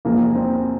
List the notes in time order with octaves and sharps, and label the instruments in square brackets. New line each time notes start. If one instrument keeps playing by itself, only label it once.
[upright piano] E2 C3 F3 G#3 [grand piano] A#3
[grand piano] C4